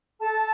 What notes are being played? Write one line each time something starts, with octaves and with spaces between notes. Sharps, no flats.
A4 A5